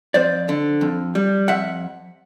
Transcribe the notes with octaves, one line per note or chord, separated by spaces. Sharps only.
F2 C5 D5
D3
F2
G3
F2 E5 F#5